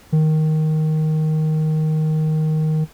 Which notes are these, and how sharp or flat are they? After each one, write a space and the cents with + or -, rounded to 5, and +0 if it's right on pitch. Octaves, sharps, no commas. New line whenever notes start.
D#3 +5